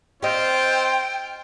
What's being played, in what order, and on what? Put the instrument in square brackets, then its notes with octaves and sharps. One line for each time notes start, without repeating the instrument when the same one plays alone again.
[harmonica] C4 F4 [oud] G4 D#5 [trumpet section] C5 [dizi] G5